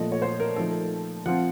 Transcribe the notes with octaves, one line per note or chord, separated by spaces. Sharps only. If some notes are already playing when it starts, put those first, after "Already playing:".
Already playing: A#2 F3 A3 D#5
C#5
C5
A#4
F3 A3 D#4 A4
F3 C4 F4 F#5